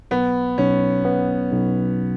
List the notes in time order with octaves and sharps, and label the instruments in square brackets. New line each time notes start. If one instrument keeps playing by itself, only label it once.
[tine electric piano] B1 [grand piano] B3
[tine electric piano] B1 [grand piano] C#4
[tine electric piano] B3
B1